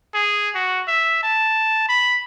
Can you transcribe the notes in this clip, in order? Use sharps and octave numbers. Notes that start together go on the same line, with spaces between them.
G#4
F#4
E5
A5
B5